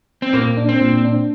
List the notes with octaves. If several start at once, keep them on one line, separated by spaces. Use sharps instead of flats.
C4
A#2 A#3
D4
C4
A#2
D4